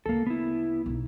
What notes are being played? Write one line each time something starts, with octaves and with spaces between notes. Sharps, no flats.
D2 C#3 A#3 A4
B3 E4
B1 D#4